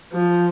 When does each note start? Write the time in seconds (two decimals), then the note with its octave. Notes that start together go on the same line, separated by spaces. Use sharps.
0.13 F3